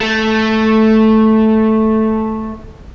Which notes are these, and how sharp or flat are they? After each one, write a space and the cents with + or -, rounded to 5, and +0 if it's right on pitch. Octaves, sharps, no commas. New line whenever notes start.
A3 -5